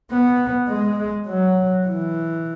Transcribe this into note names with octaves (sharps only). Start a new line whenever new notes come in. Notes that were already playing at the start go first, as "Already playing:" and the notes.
B3
G#3
F#3
E3